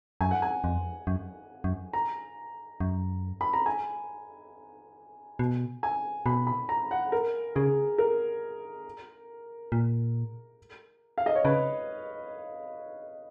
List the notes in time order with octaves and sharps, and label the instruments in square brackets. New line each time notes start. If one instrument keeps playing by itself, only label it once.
[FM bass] F#2 [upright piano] G#5
[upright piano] F#5
G#5
[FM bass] F2
F#2
F#2
[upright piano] A#5
[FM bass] F#2
[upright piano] B5
A#5
G#5
[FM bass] B2
[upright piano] G#5
[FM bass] B2 [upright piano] B5
[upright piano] B5
A#5
F#5
A#4
[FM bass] C#3 [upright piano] G#4
[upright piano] A#4
[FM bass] A#2
[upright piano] F5
D#5
C#5
[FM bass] C#3 [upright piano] B4